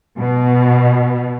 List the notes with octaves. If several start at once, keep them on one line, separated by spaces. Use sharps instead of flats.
B2